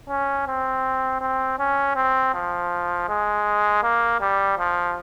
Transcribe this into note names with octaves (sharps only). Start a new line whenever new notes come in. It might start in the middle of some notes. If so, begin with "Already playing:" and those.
C#4
C4
C4
C#4
C4
F3
G#3
A#3
G3
F3